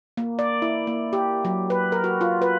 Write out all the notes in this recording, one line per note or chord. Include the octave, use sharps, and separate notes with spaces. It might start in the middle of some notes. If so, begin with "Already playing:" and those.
A#3
D5
E4
A#3
G4
F#3
B4
A#4
F#4
F4
B4